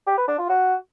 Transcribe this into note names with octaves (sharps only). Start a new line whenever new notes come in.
G4
B4
D4
F4
F#4